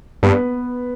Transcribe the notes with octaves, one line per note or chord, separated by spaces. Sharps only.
G2 B3 B4